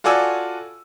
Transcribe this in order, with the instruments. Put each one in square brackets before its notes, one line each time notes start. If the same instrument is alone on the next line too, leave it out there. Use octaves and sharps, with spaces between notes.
[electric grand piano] F4 F#4 A4 D5 G#5 E6